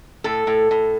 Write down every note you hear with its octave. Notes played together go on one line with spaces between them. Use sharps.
A2 A4
A2
A2